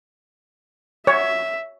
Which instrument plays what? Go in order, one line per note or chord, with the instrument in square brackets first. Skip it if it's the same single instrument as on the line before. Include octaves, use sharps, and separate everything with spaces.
[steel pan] C#5 [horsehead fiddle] E5